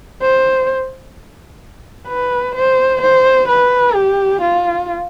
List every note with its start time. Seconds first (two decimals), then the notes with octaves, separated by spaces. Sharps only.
0.22 C5
2.08 B4
2.55 C5
3.01 C5
3.48 B4
3.94 G4
4.41 F4